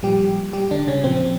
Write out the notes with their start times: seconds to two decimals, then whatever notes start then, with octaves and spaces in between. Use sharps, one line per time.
0.03 A#2 F3 G3 G4
0.53 G3 G4
0.71 D3 D4
0.87 C#3 C#4
1.04 A#2 F3 C4